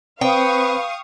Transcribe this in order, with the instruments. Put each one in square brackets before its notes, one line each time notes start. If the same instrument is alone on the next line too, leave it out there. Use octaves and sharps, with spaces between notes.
[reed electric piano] C4 C5 [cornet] B4 [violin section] F5 C#6 D#6 [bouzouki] G5